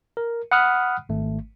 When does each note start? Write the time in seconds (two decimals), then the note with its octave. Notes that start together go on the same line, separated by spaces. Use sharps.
0.17 A#4
0.51 F#5 B5 D#6 F6 F#6
1.09 G#1 A3